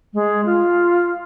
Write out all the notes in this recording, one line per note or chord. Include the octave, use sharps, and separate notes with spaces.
G#3
F4